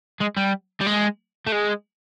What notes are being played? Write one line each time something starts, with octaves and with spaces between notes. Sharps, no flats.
G#3
G3
G3
G#3
A3
G#3